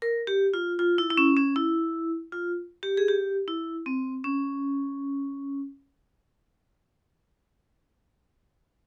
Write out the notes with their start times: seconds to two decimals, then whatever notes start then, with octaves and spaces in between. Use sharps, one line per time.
0.02 A#4
0.27 G4
0.54 F4
0.79 F4
0.98 E4
1.10 E4
1.17 C#4
1.37 C#4
1.56 E4
2.32 F4
2.83 G4
2.97 G#4
3.08 G4
3.48 E4
3.86 C4
4.24 C#4